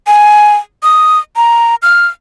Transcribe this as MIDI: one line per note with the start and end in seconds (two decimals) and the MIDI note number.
0.07 0.55 80
0.83 1.18 87
1.36 1.75 82
1.82 2.06 89